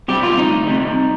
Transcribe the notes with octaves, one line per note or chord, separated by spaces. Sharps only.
C3 G3 G4
F4
D2 D#4
C3 G3